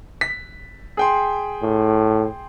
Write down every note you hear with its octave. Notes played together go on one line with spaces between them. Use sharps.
B6
G#4 G5 C6
A2